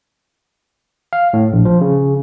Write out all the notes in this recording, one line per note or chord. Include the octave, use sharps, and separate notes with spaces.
F5
A2
A#1
F3
C#3